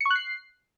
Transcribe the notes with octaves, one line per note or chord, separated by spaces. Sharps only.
C#7
C#6
F#6
C7